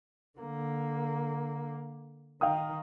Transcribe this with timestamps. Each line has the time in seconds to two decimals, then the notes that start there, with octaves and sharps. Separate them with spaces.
0.39 D3 A#3
2.41 D#3 D#4 F5 G5 D#6